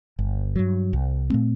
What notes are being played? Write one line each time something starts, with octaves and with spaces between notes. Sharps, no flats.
G1
G2 F#3
C2
A#2 A3 C4